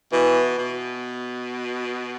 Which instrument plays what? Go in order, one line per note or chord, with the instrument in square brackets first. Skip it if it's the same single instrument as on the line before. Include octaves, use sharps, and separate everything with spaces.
[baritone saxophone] B2 [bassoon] E3
[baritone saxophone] B2